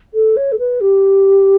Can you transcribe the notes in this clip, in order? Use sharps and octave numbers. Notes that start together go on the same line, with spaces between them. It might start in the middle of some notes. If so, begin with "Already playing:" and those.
A4
C#5
A4
B4
G4